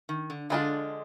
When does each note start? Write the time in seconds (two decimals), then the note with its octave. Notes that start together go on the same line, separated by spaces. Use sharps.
0.09 D#3
0.30 D3
0.50 D3 F3 G#3 D4 F4